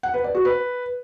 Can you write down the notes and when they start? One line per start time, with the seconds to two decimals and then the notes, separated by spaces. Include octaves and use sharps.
0.03 F#5
0.14 B4
0.24 D5
0.35 F#4
0.45 B4